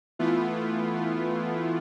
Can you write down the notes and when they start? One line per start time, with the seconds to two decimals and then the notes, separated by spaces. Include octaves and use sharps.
0.19 E3 A3 B3 E4 F4